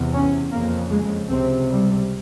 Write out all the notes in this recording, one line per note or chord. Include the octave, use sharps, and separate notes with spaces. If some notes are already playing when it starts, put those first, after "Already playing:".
Already playing: E2 C3
C#4
F2 C#3 A#3
G#3
C#2 C3 C4
G3